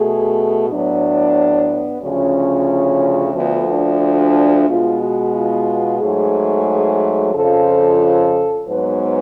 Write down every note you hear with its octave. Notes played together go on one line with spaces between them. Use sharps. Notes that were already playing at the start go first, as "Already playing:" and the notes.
Already playing: B2 A3 G#4
A2 F#3 B3 D4
D2 C#3 F3 C#4
D2 D3 F3 B3
D4
B2 G#3 B3 F4
F#4
F4
G#2 F#3 A3 G#4
F2 C#3 F3 A4
G#2 F#3 B3 B4